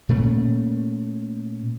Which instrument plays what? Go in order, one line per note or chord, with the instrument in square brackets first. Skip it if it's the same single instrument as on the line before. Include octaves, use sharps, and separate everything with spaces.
[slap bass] A#2 A3 C#4